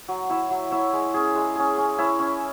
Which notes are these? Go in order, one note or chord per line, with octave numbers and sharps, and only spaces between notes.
F#3
E4 C#5 E5
F#3
E4 C#5 E5
G#3
C#4 G#4
G#3
C#4 G#4
C#4
E4 C#5 E5
C#4